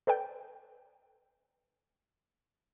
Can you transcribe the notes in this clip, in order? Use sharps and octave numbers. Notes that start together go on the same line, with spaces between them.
A4 B4 D5 G5